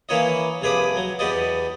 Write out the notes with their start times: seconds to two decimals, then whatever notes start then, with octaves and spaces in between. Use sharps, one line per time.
0.09 E3 A#3 E4 C#5 D#5
0.62 C2 F2 G#4 B4 D6 D#6
0.96 F#3
1.19 E2 B3 G4 D5 D#5